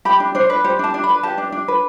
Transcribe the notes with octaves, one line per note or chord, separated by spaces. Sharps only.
G4 B5
D4
D4 C5
B4
G4 C5
D4 A5
D4
B5
B4
G4 A5
D4
D4
B4